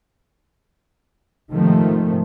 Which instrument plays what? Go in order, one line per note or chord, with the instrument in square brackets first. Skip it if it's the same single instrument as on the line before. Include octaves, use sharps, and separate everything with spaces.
[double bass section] G#2 C3 D#3 F3 A3